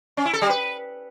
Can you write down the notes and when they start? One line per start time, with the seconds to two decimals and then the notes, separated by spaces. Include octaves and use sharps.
0.17 C#4
0.25 E4
0.33 A4
0.42 G3
0.50 B4